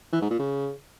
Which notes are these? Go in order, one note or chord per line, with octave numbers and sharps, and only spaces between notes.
E3
G#2
A#2
C#3